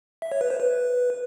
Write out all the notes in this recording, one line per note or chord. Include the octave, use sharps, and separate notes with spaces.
E5
C#5
B4
C5
B4